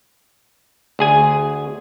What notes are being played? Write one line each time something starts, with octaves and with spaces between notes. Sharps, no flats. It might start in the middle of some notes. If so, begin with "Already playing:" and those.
D2 G#4 G#5